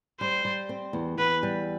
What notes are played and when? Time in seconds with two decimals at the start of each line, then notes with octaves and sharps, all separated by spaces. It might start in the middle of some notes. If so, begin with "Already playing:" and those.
0.20 G3 C5
0.45 G3
0.69 C4
0.93 E2
1.18 E2 B4
1.43 G3